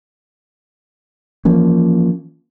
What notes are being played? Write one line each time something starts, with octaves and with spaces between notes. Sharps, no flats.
E3 F3 A#3 C#4